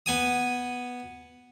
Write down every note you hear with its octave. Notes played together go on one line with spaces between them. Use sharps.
B3 G#5 D#6